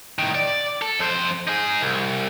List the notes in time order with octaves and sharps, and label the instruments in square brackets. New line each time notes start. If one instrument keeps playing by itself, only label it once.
[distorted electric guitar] A2 D#3
D5
A4
F2 C5
D#4 G#4
C2